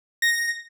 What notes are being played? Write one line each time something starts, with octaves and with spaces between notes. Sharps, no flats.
A#6